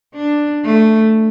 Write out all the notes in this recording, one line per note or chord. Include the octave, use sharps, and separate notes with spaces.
D4
A3